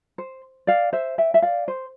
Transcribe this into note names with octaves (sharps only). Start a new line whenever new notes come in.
C5
D5 F5
C5 E5
E5 G5
E5
D5 F5
C5